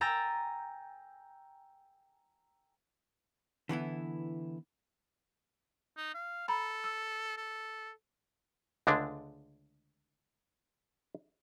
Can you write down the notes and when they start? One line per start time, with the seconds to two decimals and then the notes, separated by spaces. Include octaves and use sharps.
0.01 G5 G#5 A#5 E6 A6
3.69 D3 E3 B3 E4
5.97 D#4
6.14 F5
6.48 A4 A#5 B5
6.84 E6
7.37 A4
8.87 C#2 D3 G#3 A3 D4